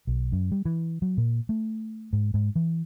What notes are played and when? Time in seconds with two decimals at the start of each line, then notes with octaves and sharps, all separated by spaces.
0.07 B1
0.32 F#2
0.52 G3
0.65 E3
1.02 F#3
1.17 A#2
1.49 A3
2.13 G#2
2.34 G#2
2.55 E3